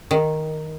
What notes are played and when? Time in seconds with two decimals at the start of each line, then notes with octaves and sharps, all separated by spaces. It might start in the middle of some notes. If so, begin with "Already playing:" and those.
0.11 D#3